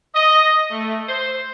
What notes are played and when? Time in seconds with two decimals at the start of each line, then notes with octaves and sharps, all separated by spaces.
0.15 D#5
0.71 A3
1.08 C5